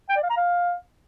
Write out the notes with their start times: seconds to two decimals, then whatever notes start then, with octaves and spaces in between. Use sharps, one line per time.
0.09 G5
0.16 D5
0.23 F5
0.30 A#5
0.37 F5